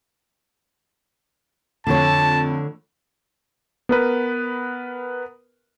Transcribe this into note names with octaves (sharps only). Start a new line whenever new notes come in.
F2 A2 D3 C#5 A5
B3 A#4 B4